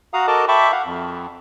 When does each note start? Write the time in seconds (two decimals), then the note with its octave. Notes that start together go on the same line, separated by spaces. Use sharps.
0.14 F#4 F5 F#5 A#5 D#6
0.27 F#4 A4 A#4 D#5 A5 D6
0.48 E5 G5 A5 B5 C#6 D6
0.72 F5 F#5
0.85 F2